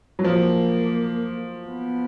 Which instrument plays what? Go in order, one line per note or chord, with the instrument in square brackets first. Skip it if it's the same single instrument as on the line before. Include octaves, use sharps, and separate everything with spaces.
[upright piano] F#3
[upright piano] F3 [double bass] A#3
[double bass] B3